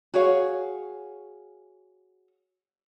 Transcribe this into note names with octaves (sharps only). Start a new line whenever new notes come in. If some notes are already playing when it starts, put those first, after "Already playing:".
F#4 G#4 C#5 F5